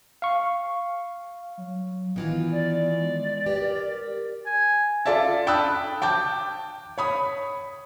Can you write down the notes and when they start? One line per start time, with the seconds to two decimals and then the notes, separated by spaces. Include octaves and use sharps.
0.22 F5 C#6
1.58 F#3
2.16 D#3 E3 B3 F4
2.52 D5
3.01 G#3
3.46 G4 B4
3.60 A#4
4.46 G#5
5.06 F4 A4 D5 E5 A5
5.47 G5 A5 B5 D#6 E6 F#6
6.02 G5 A5 D6 G6
6.98 C#5 B5 D#6